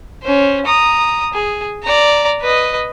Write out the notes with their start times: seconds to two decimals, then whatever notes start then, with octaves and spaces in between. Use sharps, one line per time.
0.23 C#4 C5
0.66 A#5 D#6
1.34 G#4
1.84 D5 A#5
2.42 B4 D#5